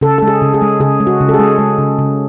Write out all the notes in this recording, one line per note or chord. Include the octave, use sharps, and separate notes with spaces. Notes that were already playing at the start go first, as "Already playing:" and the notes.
C#3 A4
G#3 A4
G#4
C#3
G#4
G#3
C#3 G#4
G#3
F#4
C#3
A4
G#4
G#3
G#3
C#3
C#3